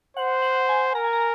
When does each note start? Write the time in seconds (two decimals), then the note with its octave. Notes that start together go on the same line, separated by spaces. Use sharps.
0.17 C5 F#5
0.42 F#5
0.69 G#5
0.95 A#4 A#5
1.04 G#5
1.13 A#5